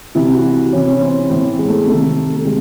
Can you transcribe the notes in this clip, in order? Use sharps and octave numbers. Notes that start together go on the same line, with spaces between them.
C3 E3 E4
F#4
C3 E3 C#4
C#4
C4
A2 E3 C4
G#3
A3
C3 D#3 A3
A3
C3 G#3